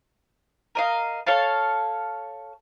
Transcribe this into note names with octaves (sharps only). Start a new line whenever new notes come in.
A#4 D#5 F5
A4 C#5 F5 A5